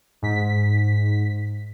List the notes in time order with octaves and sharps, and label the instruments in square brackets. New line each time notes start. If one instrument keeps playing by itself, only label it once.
[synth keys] G#2 B6